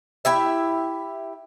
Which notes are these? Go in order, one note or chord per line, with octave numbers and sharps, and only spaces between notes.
E4 G4 E5